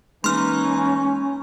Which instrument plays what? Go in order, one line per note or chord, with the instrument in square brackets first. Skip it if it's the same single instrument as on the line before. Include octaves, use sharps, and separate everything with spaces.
[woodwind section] E3 D#4 [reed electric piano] G#3 A#3 [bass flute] C#4 [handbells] C6 F6